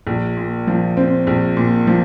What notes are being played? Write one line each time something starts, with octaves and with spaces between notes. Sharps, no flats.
A#1
A#2
F3
C4
A#1
A#2
F3